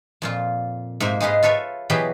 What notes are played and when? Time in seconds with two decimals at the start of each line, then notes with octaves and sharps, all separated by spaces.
0.22 F2 A#2 F4
1.00 G#2 C3 A#3 C5 E5
1.21 G#3 D#4 G#4 B4 F5
1.43 F4 A4 B4 C#5 E5
1.90 B2 E3 F#3 G4 G#4 B5